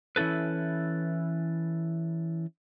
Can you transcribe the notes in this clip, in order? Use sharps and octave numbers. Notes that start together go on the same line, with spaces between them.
E3 C#4 E4 A4 B4